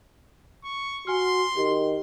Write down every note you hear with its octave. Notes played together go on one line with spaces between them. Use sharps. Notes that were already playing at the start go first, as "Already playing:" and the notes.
C#6
F#4 G#5 C6 F6
D#3 G4